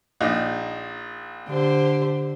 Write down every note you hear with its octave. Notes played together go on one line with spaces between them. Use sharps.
A#1 D#4
D3 G4 C5